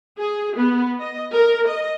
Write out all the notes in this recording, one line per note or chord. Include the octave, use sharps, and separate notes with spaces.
G#4
B3
D#5
A#4
D#5